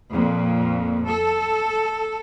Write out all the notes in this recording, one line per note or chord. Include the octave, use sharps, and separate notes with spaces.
F2 A#2
A4